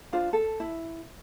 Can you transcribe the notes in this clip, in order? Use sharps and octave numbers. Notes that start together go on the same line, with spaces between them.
D4 F4 C5
A4
E4